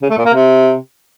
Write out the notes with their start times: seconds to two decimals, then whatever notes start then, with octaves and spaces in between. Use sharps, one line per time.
0.02 C#3
0.10 A3
0.18 A#2
0.26 A#3
0.34 C3